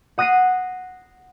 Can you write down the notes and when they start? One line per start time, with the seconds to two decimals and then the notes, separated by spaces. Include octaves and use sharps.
0.18 F#5 D#6 F#6 A#6 C7 D#7